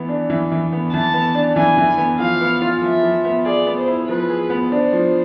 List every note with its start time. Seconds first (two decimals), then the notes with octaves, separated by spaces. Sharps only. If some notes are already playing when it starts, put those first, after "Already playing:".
Already playing: E3 B3
0.09 D4
0.30 E3
0.52 E3
0.73 B3
0.93 E3 A5
1.14 B3
1.35 D4
1.56 E3 G#5
1.78 E3
1.98 B3
2.19 F3 F5
2.41 B3
2.62 F4
2.82 F3 E5
3.03 F3
3.25 B3
3.45 G#4 D5
3.67 B3
3.77 C5
3.88 E4
4.08 F3 B4
4.30 G#4
4.50 B3
4.71 D4 C5
4.93 F3